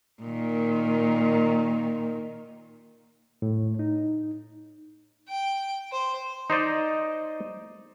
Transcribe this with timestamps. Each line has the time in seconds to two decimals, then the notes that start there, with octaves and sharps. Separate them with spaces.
0.21 A#2 D#3
3.42 A2
3.79 D#4
5.28 G5
5.92 C5
6.50 D#4 C5 D5 D#5